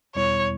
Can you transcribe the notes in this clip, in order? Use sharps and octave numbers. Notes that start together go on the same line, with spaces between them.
E2 B2 G3 B3 E4 C#5